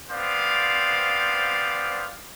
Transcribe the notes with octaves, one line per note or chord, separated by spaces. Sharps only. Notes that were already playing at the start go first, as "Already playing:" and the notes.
B3 C4 C5 D5 F5